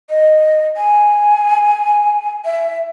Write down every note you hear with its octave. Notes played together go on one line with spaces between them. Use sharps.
D#5
G#5
E5